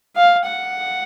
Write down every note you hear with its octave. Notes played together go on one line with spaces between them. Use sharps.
F5
F#5